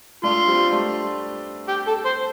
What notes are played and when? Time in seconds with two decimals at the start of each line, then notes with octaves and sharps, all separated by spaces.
0.23 A3 D4 F4
0.47 G3 C4
0.72 A3 D4
1.68 G4
1.87 A4
2.05 C5